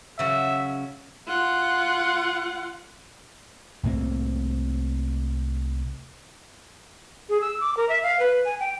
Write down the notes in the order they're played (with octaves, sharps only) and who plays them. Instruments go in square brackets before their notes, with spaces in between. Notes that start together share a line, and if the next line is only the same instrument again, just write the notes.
[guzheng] C#3 F#3 [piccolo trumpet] E5
[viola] F4 F#5
[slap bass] C2 A2 A#3 C4
[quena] G#4
E6
D6
A#4
E5
F5
B4
G#5
G5